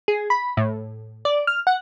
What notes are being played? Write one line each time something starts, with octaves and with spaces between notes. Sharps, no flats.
G#4
B5
A2
D5
F6
F#5